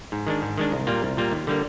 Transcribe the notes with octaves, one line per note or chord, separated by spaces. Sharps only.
G#2
D#3 G#3 D4
G#2
D#3 G#3 D4
C2
A#2 G3 A#3 F4
C2
A#2 G3 A#3 F4
D#2
D3 G3 A#3